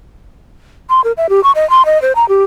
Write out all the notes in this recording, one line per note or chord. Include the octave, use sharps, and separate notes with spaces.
C6
A#4
E5
G4
C#6
D#5
C6
D#5
C5
A#5
G4